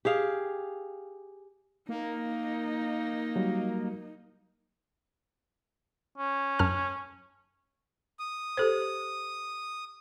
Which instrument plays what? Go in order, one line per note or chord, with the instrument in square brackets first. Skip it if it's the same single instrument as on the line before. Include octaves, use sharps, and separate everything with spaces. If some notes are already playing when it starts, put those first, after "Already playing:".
[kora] G4 G#4 F5
[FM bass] A#3 [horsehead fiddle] D#4
[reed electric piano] F#3 G3
[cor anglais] C#4
[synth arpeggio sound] F#2 A5 F6
[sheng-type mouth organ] D#6
[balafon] G4 A4 C5